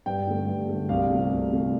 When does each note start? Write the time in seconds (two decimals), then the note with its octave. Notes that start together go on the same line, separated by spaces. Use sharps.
0.06 G2 G5
0.27 D3 A3
0.48 G2
0.69 D3 A3
0.89 C2 F5
1.10 C3 A3
1.31 C2
1.52 C3 A3